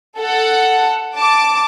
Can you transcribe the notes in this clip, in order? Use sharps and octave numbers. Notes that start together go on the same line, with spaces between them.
A4 F#5
A5 D6